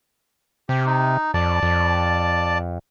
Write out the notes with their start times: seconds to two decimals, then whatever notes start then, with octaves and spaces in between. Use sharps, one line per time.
0.69 C3 G4
0.86 D#4
1.34 F2 D5 A5
1.63 F2